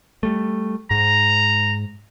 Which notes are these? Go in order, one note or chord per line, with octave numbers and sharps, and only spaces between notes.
G3 A3
G#2 A#5